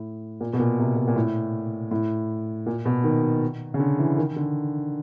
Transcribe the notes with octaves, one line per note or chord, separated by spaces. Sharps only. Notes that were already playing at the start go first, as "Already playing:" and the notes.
Already playing: A2
A#2
B2
A#2
C3
A#2
A#2
A2
A2
A#2
B2
D#3
C#3
D3
E3
D#3
D3